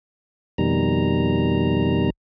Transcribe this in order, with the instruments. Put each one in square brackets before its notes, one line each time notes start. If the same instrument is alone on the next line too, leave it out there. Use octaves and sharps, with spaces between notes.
[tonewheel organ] F2 B2 D#3 G3 A#5